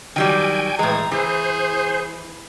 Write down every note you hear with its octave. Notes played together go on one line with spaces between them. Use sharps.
D#3 F#3 G3 G5 G#5
A2 E3 G#3 A#5 G#6
E3 G#4 C5